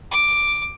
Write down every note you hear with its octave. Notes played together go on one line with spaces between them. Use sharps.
D6